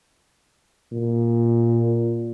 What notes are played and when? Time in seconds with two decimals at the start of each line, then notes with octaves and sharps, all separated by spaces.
0.93 A#2